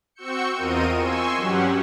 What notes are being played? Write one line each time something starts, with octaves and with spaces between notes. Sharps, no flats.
C4 F#4 C#6 E6 G6 C#7
E2 C4 F4 A#4 D#5 D#7
G#5 C6 C#6 E6
G2 F#3 C#4 G4 F#5